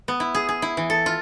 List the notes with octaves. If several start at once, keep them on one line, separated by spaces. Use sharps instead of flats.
B3
E4
G#4
G#4
E4
E3
A4
F4